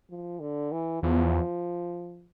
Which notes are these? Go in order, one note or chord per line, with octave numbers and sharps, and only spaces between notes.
F3
D3
E3
E2 F3